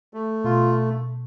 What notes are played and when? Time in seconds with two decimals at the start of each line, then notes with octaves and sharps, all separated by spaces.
0.14 A3
0.44 B2 F4